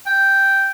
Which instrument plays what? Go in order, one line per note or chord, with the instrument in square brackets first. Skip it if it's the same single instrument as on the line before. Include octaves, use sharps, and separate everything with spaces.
[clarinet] G5